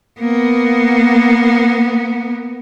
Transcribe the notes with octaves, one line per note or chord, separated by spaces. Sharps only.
A#3 B3